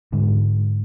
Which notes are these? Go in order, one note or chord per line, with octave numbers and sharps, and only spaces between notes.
G#2 D3